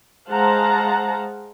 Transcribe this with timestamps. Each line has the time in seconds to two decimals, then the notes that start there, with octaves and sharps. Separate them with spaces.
0.29 G#3 C5 F5 F#5 A5 A#5